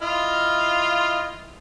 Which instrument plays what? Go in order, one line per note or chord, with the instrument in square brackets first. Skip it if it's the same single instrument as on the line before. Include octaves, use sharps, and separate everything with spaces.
[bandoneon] E4 D#5 F6 [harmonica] F4